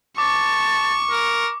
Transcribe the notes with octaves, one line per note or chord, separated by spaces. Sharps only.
A5 C#6 D6
A#4